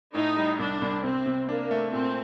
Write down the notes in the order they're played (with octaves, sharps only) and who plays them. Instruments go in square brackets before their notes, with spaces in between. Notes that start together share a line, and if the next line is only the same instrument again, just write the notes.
[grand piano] A2 [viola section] D#4
[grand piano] G3
[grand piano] C2 [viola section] D4
[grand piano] C2
[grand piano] C3 [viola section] C4
[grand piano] C3
[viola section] A#3 [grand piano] D4
[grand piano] A3
[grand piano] A#2 [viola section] C4